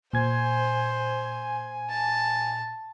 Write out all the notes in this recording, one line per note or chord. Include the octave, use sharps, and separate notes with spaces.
A#2 C5 G#5 G#6
A5